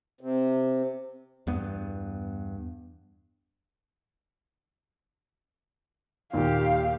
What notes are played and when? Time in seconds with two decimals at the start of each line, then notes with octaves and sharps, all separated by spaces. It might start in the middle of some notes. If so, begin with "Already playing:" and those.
0.21 C3
1.47 E2 G2 B3
6.33 D#2 A#2 A#3 G4 F5